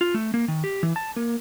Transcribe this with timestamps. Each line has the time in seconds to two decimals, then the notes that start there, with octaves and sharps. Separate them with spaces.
0.01 F4
0.14 A3
0.34 A#3
0.48 D#3
0.64 G4
0.83 E3
0.96 A5
1.16 A#3